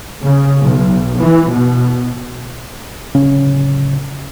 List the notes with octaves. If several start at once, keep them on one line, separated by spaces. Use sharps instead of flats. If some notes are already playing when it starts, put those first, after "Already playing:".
C#3
B1
E3
B2
D1 C#3 C#4